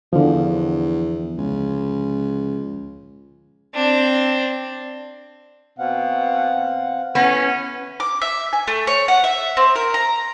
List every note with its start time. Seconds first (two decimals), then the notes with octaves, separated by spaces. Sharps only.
0.13 E2 D3 F3
1.38 C#2
3.74 C4 D4
5.79 B2 C4 F5 F#5
7.15 B3 C#4 E4
8.00 D6
8.22 E5
8.53 G#5
8.68 A3
8.87 C#5
9.08 F#5
9.24 E5
9.57 C4
9.76 A#4
9.94 A#5